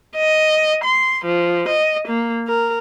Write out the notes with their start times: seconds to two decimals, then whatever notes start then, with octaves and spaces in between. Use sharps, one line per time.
0.17 D#5
0.84 C6
1.25 F3
1.68 D#5
2.08 A#3
2.48 A#4